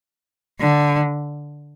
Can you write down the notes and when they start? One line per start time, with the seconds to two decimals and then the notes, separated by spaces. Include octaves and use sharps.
0.60 D3